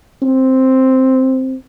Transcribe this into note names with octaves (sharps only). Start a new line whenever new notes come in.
C4